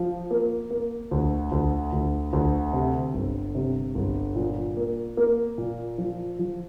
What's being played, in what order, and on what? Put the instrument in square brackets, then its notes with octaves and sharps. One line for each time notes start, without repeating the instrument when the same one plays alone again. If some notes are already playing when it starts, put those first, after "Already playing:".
Already playing: [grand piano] F3
A#3
A#3
D2
D2
D2
D2
C3
G1
C3
G1
A#2
A#3
A#3
A#2
F3
F3